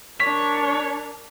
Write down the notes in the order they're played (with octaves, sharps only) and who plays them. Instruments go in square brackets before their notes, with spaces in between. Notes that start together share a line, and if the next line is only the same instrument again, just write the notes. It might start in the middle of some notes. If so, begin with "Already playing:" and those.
[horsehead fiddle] D4 A#4 [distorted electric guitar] C#5 [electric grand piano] B6